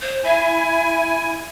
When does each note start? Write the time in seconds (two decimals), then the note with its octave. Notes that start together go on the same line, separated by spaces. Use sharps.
0.01 C5
0.24 E4 E5 G#5